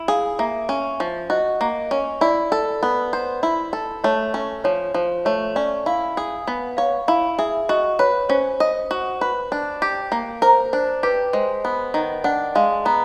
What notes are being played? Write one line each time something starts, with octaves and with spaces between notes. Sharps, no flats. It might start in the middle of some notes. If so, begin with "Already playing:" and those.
Already playing: E4
G#4 F5
A#3 E5
C#4
F3
F#4 D#5
A#3
C#4
E4 D5
A4
B3
C5
E4
A4
A3 C#5
C#4
F3 C#5
F3 C5
A3 C#5
C#4 D5
E4 F5
G#4
B3
C#5 F5
E4 F5
G#4 E5
F#4 D#5
B4 C#5
C#4 C5
D#5
F#4
B4
D4
G4
A#3
A#4 C5
D4 C5
G4 B4
G#3 C5
B3
D#3
D4 F#5
G#3 F5
B3 A#5